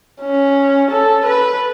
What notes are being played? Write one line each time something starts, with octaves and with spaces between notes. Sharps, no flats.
C#4
A4
B4